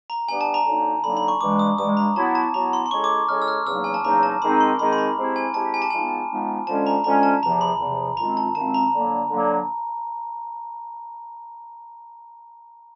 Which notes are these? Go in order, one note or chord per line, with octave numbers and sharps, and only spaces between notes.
A#5
G3 B3 D4 G4 G#5
A5
A#5
D3 F#3 A#3 D#4
D3 F#3 A#3 D#4 B5
B5
C#6
G2 E3 G#3 D6
D#6
G2 E3 G#3 D#6
A#5
F#3 B3 E4 A5
A5
F#3 B3 E4 A#5
C6
C6
G#3 C#4 E4 A4 C#5 C#6
D6
G#3 C#4 E4 A4 C#5 F6
E6
F6
E2 C#3 F#3 A#3 D#4 E6
G#5
A5
E2 C#3 F#3 A#3 D#4 A#5
A5
D#3 G#3 C4 D#4 B5
C6
D#3 G#3 C4 D#4 B5
B5
A#5
G#3 C4 E4 G4
G#5
G#3 C4 E4 G4 A5
G#5
A5
F3 G#3 B3 D#4 G#5
F3 G#3 B3 D#4
D3 F3 G#3 C#4 A5
A#5
D3 F3 G#3 C#4 A#5
A5
E2 C3 F3 A#5
B5
E2 C3 F3
F#2 D#3 G#3 C4 F4 A#5
A5
F#2 D#3 G#3 C4 F4 A5
A#5
D3 F#3 A#3
D3 F#3 A#3